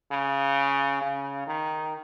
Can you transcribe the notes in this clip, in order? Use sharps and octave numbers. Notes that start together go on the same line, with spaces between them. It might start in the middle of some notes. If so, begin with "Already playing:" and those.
C#3
C#3
D#3